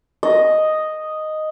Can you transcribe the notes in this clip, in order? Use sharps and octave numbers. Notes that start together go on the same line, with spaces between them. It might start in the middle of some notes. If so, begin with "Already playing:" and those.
D#5